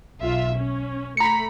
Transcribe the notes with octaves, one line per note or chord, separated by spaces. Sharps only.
B1 F4 E5
C#4
A3 A#5 B5 C#7